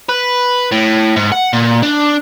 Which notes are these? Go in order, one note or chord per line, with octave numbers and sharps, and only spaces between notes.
B4
A2
G#2
F#5
A#2
D4